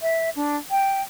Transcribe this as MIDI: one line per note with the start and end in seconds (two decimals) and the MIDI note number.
0.01 0.30 76
0.36 0.57 62
0.71 1.02 79